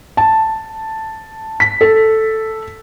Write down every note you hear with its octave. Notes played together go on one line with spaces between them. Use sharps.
A5
B6
A4